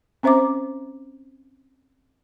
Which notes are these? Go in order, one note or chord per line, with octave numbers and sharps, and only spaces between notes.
C4 C#4 C5 E5 A#5 D6